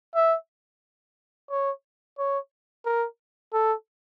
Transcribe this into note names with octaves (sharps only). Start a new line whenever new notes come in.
E5
C#5
C#5
A#4
A4